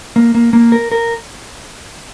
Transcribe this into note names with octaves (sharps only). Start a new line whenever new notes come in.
A#3
A#3
A#3
A#4
A#4